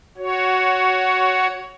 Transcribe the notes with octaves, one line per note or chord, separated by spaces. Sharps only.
F#4 C#5